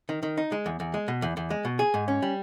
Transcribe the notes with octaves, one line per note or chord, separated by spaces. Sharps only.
D#3
D#3
D#4
G#3
E2
E2
G#3
B2
E2
E2
G#3
B2
G#4
G#2
C#4
G3